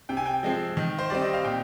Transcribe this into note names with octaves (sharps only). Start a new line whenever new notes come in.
C3 G5
G#5
G5
F3 G#3 C4
D#3
C5
G3 C4 D5
D#5
F5
A#2 G5